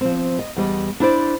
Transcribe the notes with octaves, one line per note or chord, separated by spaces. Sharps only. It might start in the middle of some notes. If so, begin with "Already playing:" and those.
F3 C4
D#5
E2 G3 D#5
D4 E4 C5 D5